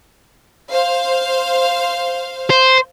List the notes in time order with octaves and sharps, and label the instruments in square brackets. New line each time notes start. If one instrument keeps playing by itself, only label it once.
[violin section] C5 F5
[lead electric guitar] C5